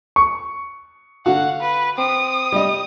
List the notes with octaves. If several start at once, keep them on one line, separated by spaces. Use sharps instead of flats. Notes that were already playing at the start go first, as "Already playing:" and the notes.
C#6
D3 F#4 F5 F#5
B4
C4 D#6
G3 D#5